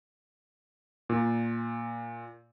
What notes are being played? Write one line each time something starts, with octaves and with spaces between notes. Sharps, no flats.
A#2